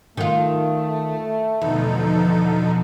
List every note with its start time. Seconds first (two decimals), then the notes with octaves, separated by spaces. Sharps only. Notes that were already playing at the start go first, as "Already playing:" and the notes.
0.17 D#3 A3 F4
1.61 E2 B2 D3 F3 D#4 A4